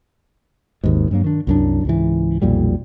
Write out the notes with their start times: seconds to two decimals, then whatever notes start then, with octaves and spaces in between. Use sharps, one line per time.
0.84 G#1 D#2 G#2
1.11 G2 F#3 A#3
1.24 D#3 D4
1.47 C2 F#2 D4
1.85 C#2 G#2 E3
2.42 B1 F2 A#2 G3